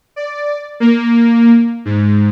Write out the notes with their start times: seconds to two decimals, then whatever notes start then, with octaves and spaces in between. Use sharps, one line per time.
0.16 D5
0.80 A#3
1.85 G#2